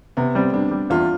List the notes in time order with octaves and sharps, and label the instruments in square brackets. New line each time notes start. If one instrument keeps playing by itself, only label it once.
[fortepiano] C3 [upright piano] B3
[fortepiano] G3 [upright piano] C4
[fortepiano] G3 [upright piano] D4
[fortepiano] G3
[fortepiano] E2 [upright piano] F4